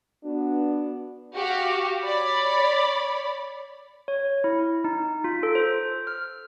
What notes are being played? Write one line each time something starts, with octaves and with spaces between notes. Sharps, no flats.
B3 D4 F#4
F#4 G4 F5
C#5 D5 B5
C#5
E4
D#4
F4
A4
C5
F6